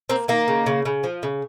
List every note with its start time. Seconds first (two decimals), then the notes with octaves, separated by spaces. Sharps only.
0.10 A#3 C4
0.28 D#3 A#3
0.48 C#3
0.66 C#3
0.85 C#3
1.04 F3
1.23 C#3